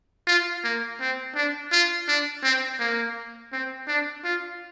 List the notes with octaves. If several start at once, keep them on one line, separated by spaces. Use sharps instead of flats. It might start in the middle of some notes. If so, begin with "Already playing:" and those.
F4
A#3
C4
D4
F4
D4
C4
A#3
C4
D4
F4